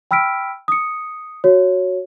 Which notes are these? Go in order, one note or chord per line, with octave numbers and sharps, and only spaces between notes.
G5 B5 E6 F6 B6 D7
D#6 C#7
F#4 C#5